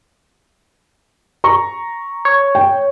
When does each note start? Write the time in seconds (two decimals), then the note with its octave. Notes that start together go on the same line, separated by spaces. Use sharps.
1.44 A#5 C#6
2.25 C#5
2.55 G5